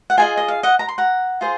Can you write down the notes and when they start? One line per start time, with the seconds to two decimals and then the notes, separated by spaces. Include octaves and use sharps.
0.10 F#5
0.17 F4 G#4 D#5 F5 G#5
0.37 D#5
0.48 F5
0.63 D#5 F#5
0.79 A#5
0.89 C6
0.98 F#5 A#5
1.41 F4 G#4 C5